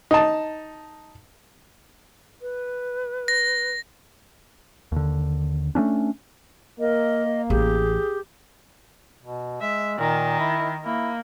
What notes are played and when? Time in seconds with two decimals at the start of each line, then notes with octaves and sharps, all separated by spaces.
0.11 D#4 A5
2.42 B4
3.28 A#6
4.92 D#2 D3
5.75 A3 A#3 C#4 D4
6.80 A#3 A#4 D#5
7.50 A1 G4 G#4
9.23 B2
9.61 G#3 E5
9.98 A#2 D#3
10.40 E4
10.84 A#3 E4